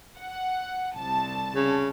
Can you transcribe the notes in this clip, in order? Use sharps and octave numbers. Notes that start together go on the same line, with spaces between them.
F#5
C2 A5
C#3